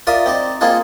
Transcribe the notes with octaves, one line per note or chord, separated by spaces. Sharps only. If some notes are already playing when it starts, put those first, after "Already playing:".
F4 A#4 D5 E5 D#6
C4 D#4 D5
A#3 C4 D#4 F4 G#4 A4